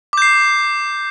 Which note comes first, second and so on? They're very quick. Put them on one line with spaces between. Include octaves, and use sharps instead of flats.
D6 G6 C7